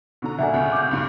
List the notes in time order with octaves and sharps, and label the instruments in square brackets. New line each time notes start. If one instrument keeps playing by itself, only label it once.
[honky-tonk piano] B2 D3 A#5
[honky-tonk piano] G1 A#2 D4 [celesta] E5 F#5 G#5
[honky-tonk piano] C#2 B2
[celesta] D6 G6
[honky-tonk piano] C#2 G2